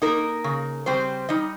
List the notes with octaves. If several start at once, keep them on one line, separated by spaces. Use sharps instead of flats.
A#3 D#4 A#4
C#3
G3 C4 C5
G3 D#4 D#5